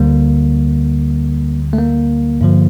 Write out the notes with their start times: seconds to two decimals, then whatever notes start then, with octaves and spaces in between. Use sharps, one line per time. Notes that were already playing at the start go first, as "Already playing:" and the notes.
Already playing: D2 D3 G3 A#3
1.73 A3
1.78 A#3
2.41 G2 D3 F3